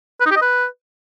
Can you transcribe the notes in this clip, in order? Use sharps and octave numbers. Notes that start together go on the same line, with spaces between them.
B4
D#4
G4
D#5
B4